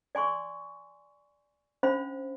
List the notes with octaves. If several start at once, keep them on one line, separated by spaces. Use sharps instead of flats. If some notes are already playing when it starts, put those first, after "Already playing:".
D5 G#5 C6 C#6
C#4 D4 C5 F5 B5